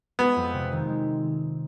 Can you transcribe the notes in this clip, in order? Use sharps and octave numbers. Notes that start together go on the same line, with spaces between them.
G#3 B3
F2
C3
D#3
G#3